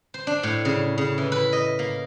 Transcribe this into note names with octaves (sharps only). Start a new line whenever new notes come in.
C5
D4
A2
C#3
C#3
E3
B4
D#5
A#3